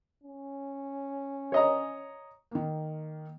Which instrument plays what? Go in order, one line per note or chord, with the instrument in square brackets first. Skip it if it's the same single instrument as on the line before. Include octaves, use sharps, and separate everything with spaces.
[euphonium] C#4
[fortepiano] C#5 D#5 A#5
[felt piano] D#3 A#3